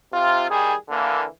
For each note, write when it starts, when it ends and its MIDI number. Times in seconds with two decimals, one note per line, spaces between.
0.13 0.48 48
0.13 0.48 65
0.49 0.74 51
0.49 0.74 55
0.49 0.74 68
0.89 1.24 50
0.89 1.24 52
0.89 1.24 58